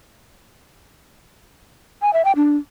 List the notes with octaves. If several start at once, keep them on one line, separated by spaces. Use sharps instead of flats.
G#5
E5
G5
D4